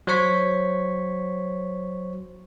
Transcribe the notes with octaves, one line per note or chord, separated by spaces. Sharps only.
F#3 C5 C#5 C#6 B6